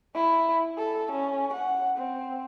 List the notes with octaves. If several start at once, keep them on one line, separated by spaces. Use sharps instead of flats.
E4
A4
C#4
F#5
C4